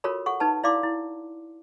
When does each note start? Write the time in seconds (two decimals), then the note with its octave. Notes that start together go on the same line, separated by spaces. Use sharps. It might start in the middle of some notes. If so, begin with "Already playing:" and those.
0.04 F4 F#4 A4 A#4 C#5 B5
0.26 A4 F#5 C#6
0.40 D#4 B4 A5
0.63 E4 D5 F5 C6 D6
0.83 E4